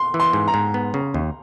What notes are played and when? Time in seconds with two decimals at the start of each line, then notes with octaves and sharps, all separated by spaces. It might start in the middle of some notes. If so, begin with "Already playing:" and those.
Already playing: C6
0.14 E3
0.20 C6
0.33 G#2
0.48 A#5
0.54 G#2
0.74 B3
0.94 C#3
1.14 D#2